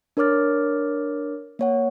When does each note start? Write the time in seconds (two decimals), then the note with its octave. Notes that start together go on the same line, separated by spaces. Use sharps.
0.17 D4 A#4 C#5 D6 F6 A6
1.59 A#3 C#5 F#5